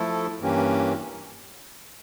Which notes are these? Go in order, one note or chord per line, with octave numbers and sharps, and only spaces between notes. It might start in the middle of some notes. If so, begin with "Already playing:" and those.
Already playing: F3 A3 E4 A4
G2 E3 A#3 C#4 G4